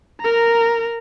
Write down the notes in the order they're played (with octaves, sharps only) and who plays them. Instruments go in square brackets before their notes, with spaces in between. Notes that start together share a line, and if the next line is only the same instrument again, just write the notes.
[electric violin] A#4 A#5